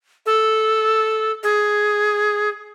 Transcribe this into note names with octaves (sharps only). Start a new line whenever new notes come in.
A4
G#4